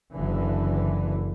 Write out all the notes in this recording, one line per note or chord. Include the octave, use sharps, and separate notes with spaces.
F#1 D3 E3